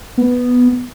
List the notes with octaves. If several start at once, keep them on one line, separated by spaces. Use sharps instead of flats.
B3